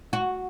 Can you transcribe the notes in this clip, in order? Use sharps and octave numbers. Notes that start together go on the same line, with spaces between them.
F#4